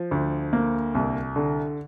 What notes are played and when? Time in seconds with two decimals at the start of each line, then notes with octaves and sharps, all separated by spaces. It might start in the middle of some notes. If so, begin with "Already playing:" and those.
Already playing: F3
0.11 D2
0.53 A#3
0.95 C2
1.36 D3